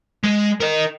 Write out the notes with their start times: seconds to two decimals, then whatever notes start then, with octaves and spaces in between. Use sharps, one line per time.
0.24 G#3
0.61 A#4 D#5